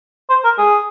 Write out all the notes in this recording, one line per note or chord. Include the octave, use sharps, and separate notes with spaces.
C5
A#4
G#4